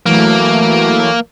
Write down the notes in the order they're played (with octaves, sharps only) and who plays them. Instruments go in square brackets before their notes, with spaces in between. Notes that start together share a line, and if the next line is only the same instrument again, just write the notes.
[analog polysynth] E3 F#3 A3 [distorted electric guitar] A#3